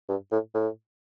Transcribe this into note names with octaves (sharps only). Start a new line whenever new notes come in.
G2
A2
A2